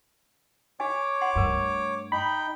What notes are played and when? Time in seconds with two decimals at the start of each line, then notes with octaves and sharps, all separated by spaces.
0.80 F#4 C#5 G#5 D6
1.21 F#5 C6
1.36 G2 A3 F#4 A#4
2.12 D#4 G5 B5